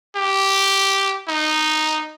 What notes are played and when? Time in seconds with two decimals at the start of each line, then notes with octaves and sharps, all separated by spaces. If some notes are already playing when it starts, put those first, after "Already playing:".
0.16 G4
1.28 D#4